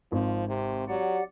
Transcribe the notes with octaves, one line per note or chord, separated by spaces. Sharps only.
G#1 F3
C3
F#3 G4 D5 F#5